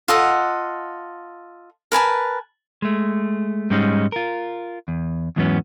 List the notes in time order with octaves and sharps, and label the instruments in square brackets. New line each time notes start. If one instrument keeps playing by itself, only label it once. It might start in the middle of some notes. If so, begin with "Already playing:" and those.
[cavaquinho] F4 A4 D#5 F#5
A#4 B4 G#5 A5
[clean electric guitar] G#3 A3
G#2 G3 G#3 C#4 D#4
F4 A#4
E2
E2 G#2 E3 F#3 B3 C#4